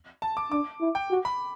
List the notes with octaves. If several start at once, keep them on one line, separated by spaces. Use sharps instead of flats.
A5
D6
D4 D6
E4
G5
F#4
B5